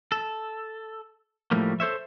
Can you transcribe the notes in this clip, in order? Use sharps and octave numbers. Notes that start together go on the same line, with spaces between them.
A4
A2 F3 G3 A3 A#3
A4 C5 C#5 E5